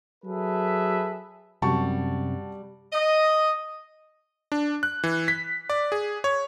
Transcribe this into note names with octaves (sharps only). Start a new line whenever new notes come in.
F#3 G#4 A4 B4 E5
F#2 C3 G3 F#4 A5 C#6
D#5
D4
F#6
E3
B6
D5
G#4
C#5